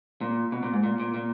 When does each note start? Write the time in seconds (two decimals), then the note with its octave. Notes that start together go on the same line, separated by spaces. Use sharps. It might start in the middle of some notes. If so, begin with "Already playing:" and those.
0.21 A#2
0.52 B2
0.63 A#2
0.73 G#2
0.84 A#2
1.00 A#2
1.14 A#2